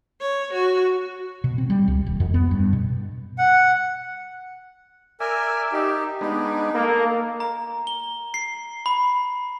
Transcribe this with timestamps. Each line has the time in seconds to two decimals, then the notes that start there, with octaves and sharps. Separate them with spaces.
0.21 C#5
0.52 F#4
1.44 B2
1.58 C4
1.70 G3
1.88 C#2
2.06 D#1
2.20 F2
2.34 B3
2.51 G2
2.73 B2
3.38 F#5
5.20 A#4 D5 E5 G#5
5.73 D#4 G4
6.21 G#3 B3 D4 D#4
6.75 A#3 A4 A#4
7.40 A#5
7.87 G7
8.34 C7
8.86 B5